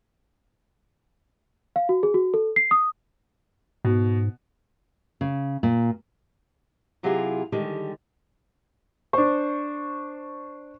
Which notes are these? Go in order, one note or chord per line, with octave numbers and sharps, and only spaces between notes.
F5
F#4
G#4
F#4
A4
C7
D#6
G#2 B2
C#3
A#2
C3 F#3 E4 F4 G4 G#4
D3 D#3 G3 G#3 G4
D4 C5 C#6